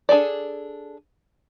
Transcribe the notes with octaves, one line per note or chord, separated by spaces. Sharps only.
D4 G#4 A4 D5